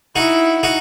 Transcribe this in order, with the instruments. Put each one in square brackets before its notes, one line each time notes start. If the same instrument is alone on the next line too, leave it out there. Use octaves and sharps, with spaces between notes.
[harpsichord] D#4 F#4 [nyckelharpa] E4
[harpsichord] D#4 F#4